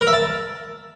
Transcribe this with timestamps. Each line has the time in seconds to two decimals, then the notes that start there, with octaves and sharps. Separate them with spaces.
0.01 A#4
0.07 E5
0.13 A5